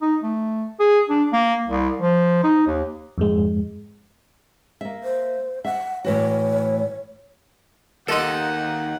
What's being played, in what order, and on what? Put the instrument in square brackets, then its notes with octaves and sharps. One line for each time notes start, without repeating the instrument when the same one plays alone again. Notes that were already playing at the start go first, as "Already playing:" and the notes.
[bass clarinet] D#4
A3
G#4
D4
A#3
C2
F3
D#4
D#2
[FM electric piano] F2 G#2 G#3
[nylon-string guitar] A#3 E5
[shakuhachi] C5
[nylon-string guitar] E5 [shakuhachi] F#5
[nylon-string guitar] A2 E3 F#4 [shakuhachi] C#5
[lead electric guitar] D#2 [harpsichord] D#4 A4 [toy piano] A#4 F5 C6 [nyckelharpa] F#5